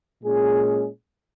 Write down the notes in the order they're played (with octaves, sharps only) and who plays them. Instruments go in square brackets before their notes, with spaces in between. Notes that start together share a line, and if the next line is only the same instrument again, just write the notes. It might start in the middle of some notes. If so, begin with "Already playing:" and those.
[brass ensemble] A#2 G#3 C#4 G#4